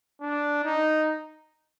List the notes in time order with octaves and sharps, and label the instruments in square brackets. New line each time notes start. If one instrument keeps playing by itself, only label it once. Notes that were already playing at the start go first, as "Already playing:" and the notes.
[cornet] D4
D#4